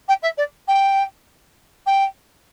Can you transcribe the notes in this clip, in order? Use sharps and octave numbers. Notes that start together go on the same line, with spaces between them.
G5
E5
D5
G5
G5